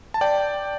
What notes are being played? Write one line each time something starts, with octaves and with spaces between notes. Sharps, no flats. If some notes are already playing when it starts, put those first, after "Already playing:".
A5
D5 G5